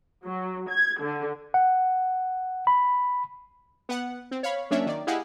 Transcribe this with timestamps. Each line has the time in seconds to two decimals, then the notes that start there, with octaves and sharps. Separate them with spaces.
0.25 F#3
0.70 G#6
1.01 D3
1.54 F#5
2.67 B5
3.89 B3 F#5
4.31 C4
4.43 C#5 F5 B5
4.71 F#3 A#3 C#4 D4 C#5 E5
4.86 D#3 D5
5.07 E4 G4 G#4 D#5 F5 F#5